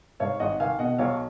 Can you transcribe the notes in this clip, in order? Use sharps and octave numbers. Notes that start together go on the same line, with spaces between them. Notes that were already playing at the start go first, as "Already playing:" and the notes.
G#2 C#5 F5
G#1 D#5 F#5
D#3 F5 G#5
B2 D#5 F#5
B1 C#5 F5